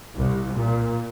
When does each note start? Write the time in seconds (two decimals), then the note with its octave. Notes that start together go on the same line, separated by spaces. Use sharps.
0.14 C2
0.53 A#2